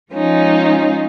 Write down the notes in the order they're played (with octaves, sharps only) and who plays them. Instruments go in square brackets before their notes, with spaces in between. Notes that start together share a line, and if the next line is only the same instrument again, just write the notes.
[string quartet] F3 G#3 C#4 D#4 F4